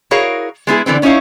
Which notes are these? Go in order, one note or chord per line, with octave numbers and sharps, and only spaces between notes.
E4 F#4 G#4 A#4 C#5 F5
G#3 B3 E4 G#4
D3 E3 B3 C4
B3 C#4 D#4 E4 C#5 F5